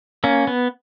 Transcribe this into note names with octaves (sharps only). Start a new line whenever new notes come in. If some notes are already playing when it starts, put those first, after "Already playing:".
A#3 C#4
B3